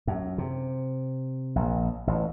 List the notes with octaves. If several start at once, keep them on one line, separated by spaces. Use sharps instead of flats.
F#2
C3
A#1
A1